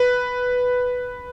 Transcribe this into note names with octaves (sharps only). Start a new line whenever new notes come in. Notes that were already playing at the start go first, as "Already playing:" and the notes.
Already playing: B4